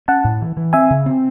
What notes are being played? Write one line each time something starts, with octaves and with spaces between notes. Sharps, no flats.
C#4 F#5 A5
A2
E3
E3
C4 E5 G#5
C#3
C4